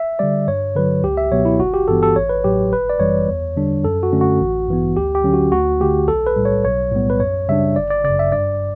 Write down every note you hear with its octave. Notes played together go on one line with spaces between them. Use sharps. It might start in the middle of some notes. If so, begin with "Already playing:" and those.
Already playing: E5
D3 G3 D5
G2 C#5
D3 F#3 B4
C#2 G4
E5
B2 F#3 B3 C#5
E4
G1 F#4
G4
G2 E3 B3 A4
A4
A1 C#5
B4
A2 F#3 G4
G1 B4
D5
F#2 E3 G3 C#5
E2
D3 G3 D4
F#2 A4
F#4
D3 A3 C#4
F#4
A1
G2 E3 B3
D2 G4
G4
D3 F#3 C#4
F#4
D2 F#4
D3 A3 G4
B1 A4
B4
A2 G3
C#5
B1 C#5
A2 G3 B3
B4
F#2 C#5
C#3 G3 D4 E5
G1 D5
D5
C#3 D5
F#2
E5
G2 D5